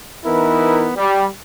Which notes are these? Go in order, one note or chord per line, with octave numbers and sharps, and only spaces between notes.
E3 B3 D#4 E4 A#4
G3